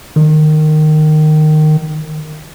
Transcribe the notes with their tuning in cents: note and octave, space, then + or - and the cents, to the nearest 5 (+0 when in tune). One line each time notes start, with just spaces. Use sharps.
D#3 -15